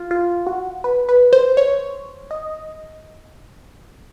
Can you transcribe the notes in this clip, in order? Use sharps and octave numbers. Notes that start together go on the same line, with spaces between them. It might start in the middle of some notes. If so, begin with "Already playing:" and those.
Already playing: F4
F4
F#4
B4
B4
C5
C#5
D#5